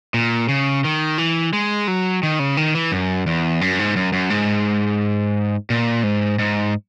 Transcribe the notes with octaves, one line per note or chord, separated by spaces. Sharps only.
A#2
C#3
D#3
E3
G#3
F#3
D#3
C#3
D#3
E3
F#2
E2
F#2
G#2
F#2
F#2
G#2
A#2
G#2
G#2